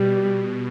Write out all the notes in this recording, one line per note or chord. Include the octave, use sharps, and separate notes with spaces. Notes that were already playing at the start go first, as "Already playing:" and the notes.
Already playing: B2 G3